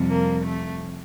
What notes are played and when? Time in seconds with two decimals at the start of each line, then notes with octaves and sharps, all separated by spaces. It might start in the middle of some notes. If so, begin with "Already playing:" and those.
Already playing: F2 C3 G3
0.10 A#3
0.45 A3